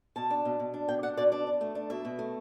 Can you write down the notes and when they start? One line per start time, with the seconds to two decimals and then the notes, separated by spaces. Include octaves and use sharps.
0.16 B2 A5
0.30 D4
0.45 B2
0.60 B2
0.74 D4
0.88 B2 G5
1.03 D4 F#5
1.17 B2 D5
1.32 D4 D5
1.47 D4
1.61 A3
1.75 D4
1.90 B2 E5
2.05 B2
2.19 A3